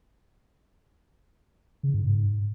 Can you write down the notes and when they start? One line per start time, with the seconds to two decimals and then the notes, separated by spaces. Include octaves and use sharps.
1.83 C#3
1.94 G#2
2.04 G#2